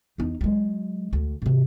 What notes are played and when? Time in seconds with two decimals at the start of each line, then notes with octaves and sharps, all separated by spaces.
0.18 E2 D#4
0.41 F#3 G#3
1.13 D2
1.42 G#2 C3